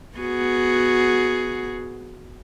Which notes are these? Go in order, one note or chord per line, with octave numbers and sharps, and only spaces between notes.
B3 F#4 G#4